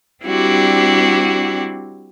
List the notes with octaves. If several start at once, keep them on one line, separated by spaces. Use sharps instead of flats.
G3 C4 D4 E4 F#4 G4